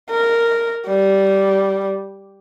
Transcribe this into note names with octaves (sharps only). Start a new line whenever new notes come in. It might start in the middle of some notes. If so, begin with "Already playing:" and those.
A#4
G3